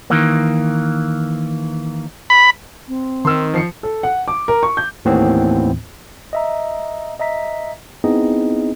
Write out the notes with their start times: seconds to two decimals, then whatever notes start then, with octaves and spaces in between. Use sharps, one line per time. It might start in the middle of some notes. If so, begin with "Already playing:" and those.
0.10 D#3 E3 A#3
2.30 B5
2.88 C4
3.25 D#3 C6 E6
3.54 F3 C7 C#7
3.83 A4
4.03 F#5
4.28 D6
4.48 A#4
4.63 C#6
4.77 G6
5.05 D#2 A2 D#3 E3 B3 C4
6.33 D#5 E5 A#5
7.19 D#5 E5 A#5 B6
8.04 B3 C4 D#4 E4 G#4 D#5